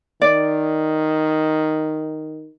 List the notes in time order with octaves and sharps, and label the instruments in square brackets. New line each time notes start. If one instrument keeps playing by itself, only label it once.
[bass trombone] D#3 [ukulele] D5